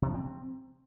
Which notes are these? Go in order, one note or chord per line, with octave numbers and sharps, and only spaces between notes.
C3
F3
C4